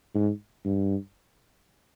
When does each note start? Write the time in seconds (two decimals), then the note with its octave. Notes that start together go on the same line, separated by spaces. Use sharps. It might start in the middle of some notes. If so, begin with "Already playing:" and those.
0.15 G#2
0.65 G2